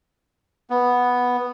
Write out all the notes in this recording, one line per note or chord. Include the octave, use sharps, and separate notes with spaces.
B3